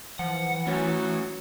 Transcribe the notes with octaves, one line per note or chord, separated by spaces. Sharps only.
E3 F3 F#5
F#3 A3 C#4 B4